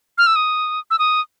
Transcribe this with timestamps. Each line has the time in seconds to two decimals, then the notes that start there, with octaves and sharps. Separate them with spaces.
0.18 F6
0.27 E6
0.36 D#6
0.91 E6
0.99 D#6